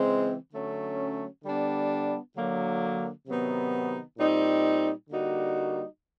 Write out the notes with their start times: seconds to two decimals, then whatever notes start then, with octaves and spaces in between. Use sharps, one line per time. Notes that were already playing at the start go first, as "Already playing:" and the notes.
Already playing: C#3 E3 G#3 C4
0.53 D3 F#3 A3 C#4
1.44 D3 G3 B3 D4
2.36 D3 F#3 A#3
3.27 C3 D#3 F#3 B3 D#4
4.18 A#2 G3 C4 D#4
5.09 D3 G3 A#3 D#4 F#4